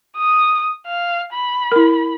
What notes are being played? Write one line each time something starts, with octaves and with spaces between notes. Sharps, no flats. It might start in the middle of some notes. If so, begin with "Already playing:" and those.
D#6
F5
B5
E4 A#4